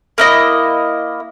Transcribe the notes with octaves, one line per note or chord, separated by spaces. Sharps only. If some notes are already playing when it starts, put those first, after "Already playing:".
A#3 E4 D#5